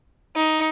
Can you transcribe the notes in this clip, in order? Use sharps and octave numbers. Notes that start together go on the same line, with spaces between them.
D#4